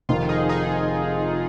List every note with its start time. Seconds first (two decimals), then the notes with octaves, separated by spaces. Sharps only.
0.09 F1 F2 D#3 F4
0.29 D#4 G#4
0.49 D#4 G#4